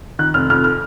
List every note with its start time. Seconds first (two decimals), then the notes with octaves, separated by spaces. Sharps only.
0.19 D#3 F#6
0.34 F1 F6
0.50 F2 F6
0.64 F6